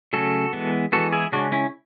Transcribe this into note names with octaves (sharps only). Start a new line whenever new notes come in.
C#3 F#3 A3 C#4 F#4 A4
E3 G#3 B3
E3 G#3 B3 F#4 A4
E4 G#4
C#3 G#3 C#4 D4 F#4
C#4 E4